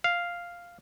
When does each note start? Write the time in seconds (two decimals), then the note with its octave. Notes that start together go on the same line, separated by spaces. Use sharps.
0.04 F5